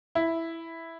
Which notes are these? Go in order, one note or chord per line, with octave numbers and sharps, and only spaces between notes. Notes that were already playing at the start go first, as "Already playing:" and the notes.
E4